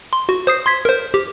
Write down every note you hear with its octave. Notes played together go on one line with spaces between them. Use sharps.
C6
F#4
C5 D#6 C7
C6 G#6 B6
A#4 C5
G4